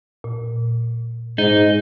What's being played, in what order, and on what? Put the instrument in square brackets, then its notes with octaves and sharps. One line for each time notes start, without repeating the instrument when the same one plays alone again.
[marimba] A#2
[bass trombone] G#2 [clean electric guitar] D#4